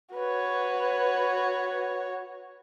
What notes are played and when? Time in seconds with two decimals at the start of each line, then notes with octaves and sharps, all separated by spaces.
0.15 F#4 B4 C#5